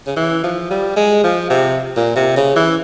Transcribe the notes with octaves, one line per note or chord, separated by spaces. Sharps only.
C#3
E3
F3
G3
G#3
F3
C3
A#2
C3
C#3
E3